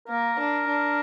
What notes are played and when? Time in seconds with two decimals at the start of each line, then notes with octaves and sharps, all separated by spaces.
0.08 A#3 A#4
0.39 D4
0.68 D4